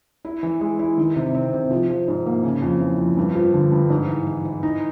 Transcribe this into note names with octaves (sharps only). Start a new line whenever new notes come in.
E4
E3
G#3
E4
D#3
C3
C4
C3
F3
F3
G#2
A#3
C#3
F2
E3
F2
G2
F3
D3
G2
G#2
E3
E3
E3
D#4